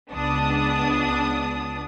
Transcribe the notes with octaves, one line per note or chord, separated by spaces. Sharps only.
C#2 B3 D4 D#6